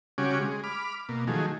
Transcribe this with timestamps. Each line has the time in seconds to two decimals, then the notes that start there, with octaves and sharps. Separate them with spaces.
0.18 C#3 G3 C#4 F#4 G#5 D6
0.40 G#3
0.64 B5 D6 F6
1.09 B2 A#3
1.27 D#3 F3 F#3 A3 G#4